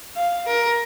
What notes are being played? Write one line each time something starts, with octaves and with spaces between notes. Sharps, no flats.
F5
A#4